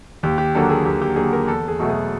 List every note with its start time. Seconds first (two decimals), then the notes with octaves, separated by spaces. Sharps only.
0.23 D#2 G4
0.38 G4
0.55 D3 F#3 A#3 A4
0.70 G#4
0.85 D#2 G4
1.02 G4
1.16 D3 F#3 A#3 G#4
1.33 A#4
1.48 E2 A4
1.68 G#4
1.80 B2 F#3 A3
1.89 G#4